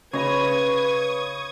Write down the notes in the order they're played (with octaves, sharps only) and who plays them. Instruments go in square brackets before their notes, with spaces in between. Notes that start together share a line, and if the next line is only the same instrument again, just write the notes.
[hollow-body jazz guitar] C#3 [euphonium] B4 [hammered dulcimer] C#5 D#5 B5 [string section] C#6 D#6 G#6